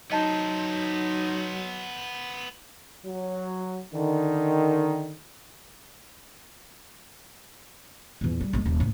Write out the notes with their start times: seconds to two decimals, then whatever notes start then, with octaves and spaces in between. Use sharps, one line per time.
0.12 F#3 B3 D#4 C5 D#5 A5
3.05 F#3
3.93 D3 D#3
8.21 E2 A#2
8.41 G3
8.53 A#1 G#3
8.66 D#1
8.80 A1 A#2